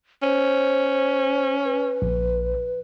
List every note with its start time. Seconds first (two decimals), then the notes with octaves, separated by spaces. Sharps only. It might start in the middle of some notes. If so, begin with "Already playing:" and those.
0.23 C#4 C5
1.65 B4
2.02 A#1